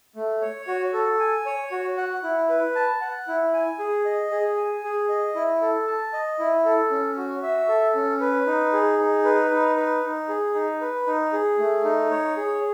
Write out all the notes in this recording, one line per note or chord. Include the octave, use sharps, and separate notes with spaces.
A3
C#5
F#4
A4
G#5
C#5
F#4
F#5
E4
B4
A5
F#5
E4
G#5
G#4
D#5
G#4
G#5
G#4
D#5
E4
A4
A5
D#5
E4
A4
C#4
F#4
E5
A4
C#4
B4
D#4
G#4
D#4
B4
D#4
B4
D#4
G#4
D#4
B4
D#4
G#4
A3
D#4
C#5
G#4